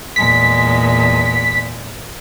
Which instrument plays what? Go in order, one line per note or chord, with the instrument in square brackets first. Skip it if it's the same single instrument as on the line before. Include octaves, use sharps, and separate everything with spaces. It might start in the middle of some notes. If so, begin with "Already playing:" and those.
[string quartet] E2 A#2 G#3 [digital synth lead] B6